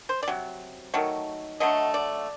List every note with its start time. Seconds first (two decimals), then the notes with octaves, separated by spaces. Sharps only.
0.09 C5
0.23 D5
0.28 C3 F#3
0.94 D#3 F#3 A3
1.60 D3 F#3 A3 D#5
1.94 D5